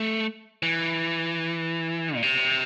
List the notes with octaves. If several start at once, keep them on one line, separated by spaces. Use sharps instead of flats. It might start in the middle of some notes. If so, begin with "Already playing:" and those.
Already playing: A3
E3
A#2
C3